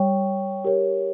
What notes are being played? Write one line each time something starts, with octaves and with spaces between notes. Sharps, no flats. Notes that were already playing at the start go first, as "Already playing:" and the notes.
Already playing: G3 C#5 G5 C#6
G4 A#4 C#5